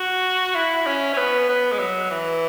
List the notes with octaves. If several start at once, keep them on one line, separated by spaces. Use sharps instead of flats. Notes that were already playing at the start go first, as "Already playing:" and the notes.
Already playing: F#4
E4
C#4
C#4
B3
B3
G#3
F#3
E3